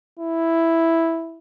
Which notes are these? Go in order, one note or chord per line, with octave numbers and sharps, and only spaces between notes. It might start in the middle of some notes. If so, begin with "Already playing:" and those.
E4